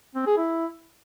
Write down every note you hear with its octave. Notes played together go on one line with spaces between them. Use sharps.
C4
G#4
E4